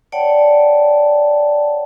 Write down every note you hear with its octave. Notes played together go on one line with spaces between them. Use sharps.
C#5 D5 F#5 G5 A5